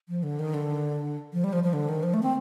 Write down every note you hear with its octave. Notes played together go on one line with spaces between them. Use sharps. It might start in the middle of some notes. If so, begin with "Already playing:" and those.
F3
D3
D#3
D3
F3
G3
F3
F3
D3
D#3
F3
A3
C4